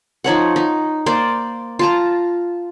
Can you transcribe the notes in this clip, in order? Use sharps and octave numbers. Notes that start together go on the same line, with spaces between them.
F3 D#4 C#5 F#5
D#4
A#3 C5 D5
F4 A5 A#5